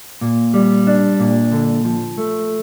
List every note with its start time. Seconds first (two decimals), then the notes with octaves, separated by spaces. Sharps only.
0.21 A#2
0.54 G3
0.87 D4
1.20 A#2
1.52 D3
1.85 F3
2.18 A3